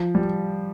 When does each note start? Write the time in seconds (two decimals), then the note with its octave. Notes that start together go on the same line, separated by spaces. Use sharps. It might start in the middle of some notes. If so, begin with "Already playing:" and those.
Already playing: F3
0.15 G3